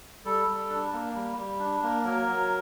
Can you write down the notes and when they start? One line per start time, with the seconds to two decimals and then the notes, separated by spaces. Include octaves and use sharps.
0.25 G3 A4
0.47 G3
0.69 D4
0.93 A#3
1.14 G3
1.37 G3
1.59 D4
1.83 A#3
2.05 F#3 A#4
2.27 F#3